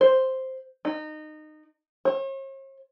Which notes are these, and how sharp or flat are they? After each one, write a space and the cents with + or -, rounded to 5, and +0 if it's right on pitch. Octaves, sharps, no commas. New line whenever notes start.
C5 +0
D#4 -20
C#5 -45